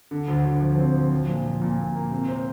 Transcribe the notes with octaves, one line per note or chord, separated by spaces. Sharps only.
D3
D2
D2
F3
C4
F3
F3
A#2
F3
A#2
A#2
A#3
C3
C4